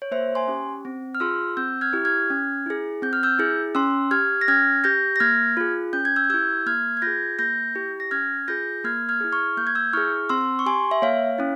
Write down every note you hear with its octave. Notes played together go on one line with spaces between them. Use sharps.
C#5
A#3 C5 E5
G#5 C6
C#4 G4
C4
F6
F4 G#4 C6 E6
C4 E6 G6
F6 G#6
E4 G4
F6 G#6
C#4
E4 G#4
C4 G6
F6
E6 G6
E4 G#4
C#4 C6 E6
G4 F6 G#6
A#6
C#4 F6 G#6
G4 G6 A#6
A#6
A#3 F6 G#6
F4 G#4
C#4 G6
G#6
E6 G6
G#6
E4 G4 E6 G6
A#3 F6 G#6
G#6
F4 G#4 G6 A#6
A#3 G6 A#6
E4 G4
A#6
C#4 F6 G#6
F4 G#4 G6 A#6
A#3 F6 G#6
F6 G#6
E4 G#4
C#6 F6
A#3 G6
G#6
E6 G6
E4 G#4 C#6 F6
C4 C6 E6
C#6
G4 G#5 C6
E5
A#3 C#5 F5
C#4 E4